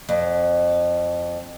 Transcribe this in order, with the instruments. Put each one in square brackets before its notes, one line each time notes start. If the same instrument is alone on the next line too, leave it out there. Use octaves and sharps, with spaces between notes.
[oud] F2